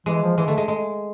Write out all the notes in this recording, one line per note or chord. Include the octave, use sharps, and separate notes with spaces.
E3 G#3
F3
E3 G#3
D3 A3
G#3
G#3